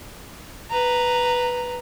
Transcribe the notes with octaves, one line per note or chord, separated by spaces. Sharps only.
B4 A#5